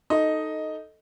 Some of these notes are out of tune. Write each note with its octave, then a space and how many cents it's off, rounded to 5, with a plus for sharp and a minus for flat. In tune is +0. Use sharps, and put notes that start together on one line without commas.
D#4 +0 A4 +0 D#5 +5